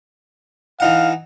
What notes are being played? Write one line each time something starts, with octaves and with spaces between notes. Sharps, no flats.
E3 D#4 F5 F#5